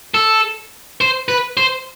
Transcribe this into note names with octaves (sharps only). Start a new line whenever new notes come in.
A4
C5
B4
C5